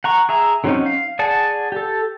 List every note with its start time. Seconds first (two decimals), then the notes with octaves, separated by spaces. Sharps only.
0.04 F#5 A#5 C#6
0.29 G#4 E5 A#5
0.64 D3 F#3 C4 C#4 D#4
0.86 F5
1.19 G#4 D5 F#5 A5
1.72 G4 A4